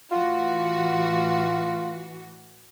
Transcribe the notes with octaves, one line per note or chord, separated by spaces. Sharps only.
A2 E3 F4 F#4